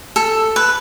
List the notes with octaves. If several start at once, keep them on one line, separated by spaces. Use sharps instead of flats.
A4
B4